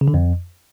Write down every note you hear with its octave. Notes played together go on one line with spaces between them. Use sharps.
C#3
D3
F2